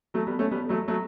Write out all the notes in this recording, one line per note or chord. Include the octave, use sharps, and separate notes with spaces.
F#3 A3
G3 B3
A3 C#4
G3 B3
F#3 A3
F#3 A3